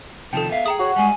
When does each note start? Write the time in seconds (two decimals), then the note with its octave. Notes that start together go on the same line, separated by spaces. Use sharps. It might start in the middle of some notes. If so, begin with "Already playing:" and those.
0.33 C3 D#3 F3 A4 G5 A5
0.51 B3 E5 F5
0.66 G#4 G5 A#5 D#6
0.79 F#4 C#5
0.96 G3 G#3 G#5